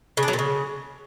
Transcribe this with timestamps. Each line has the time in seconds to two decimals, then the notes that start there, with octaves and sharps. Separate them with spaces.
0.17 C#3
0.23 D4
0.28 F#3
0.33 A#2
0.39 C#3